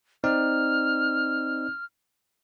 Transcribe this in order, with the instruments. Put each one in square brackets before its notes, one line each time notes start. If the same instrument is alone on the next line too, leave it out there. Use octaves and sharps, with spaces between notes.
[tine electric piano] C4 D#4 D5 [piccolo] F6